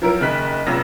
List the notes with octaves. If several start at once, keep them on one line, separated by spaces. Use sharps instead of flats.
F3 F#3 E4 A#4 D7
F#1 D#3 F#6 B6
F1 A#1 F#2 F4 E6 A#6